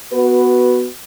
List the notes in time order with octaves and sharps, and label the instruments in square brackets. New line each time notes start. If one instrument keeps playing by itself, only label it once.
[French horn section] B3 F#4 B4